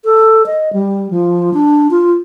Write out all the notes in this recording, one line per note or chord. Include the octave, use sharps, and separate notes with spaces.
A4
D#5
G3
F3
D4
F4